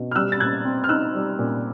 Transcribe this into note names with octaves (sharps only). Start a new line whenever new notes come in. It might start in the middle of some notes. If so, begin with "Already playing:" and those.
Already playing: B2
F6
G3 E6 F#6
A6
A#2 F#6 G#6
C4
F6
D#4 E6 F#6
G3
A#2